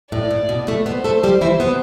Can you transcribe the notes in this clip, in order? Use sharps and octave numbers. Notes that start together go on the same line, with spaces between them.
A2 D5
A2
B2
A2 A3
B2 B3 C5
A3 A4
G3 G4
E3 E4
B2 B3